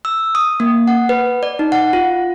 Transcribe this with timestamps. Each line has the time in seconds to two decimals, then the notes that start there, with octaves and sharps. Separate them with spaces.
0.05 E6
0.35 D#6
0.60 A#3
0.87 F#5
1.09 B4
1.43 D5
1.59 D#4
1.72 F#5
1.93 F4